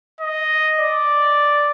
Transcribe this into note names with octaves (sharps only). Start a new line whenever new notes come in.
D#5
D5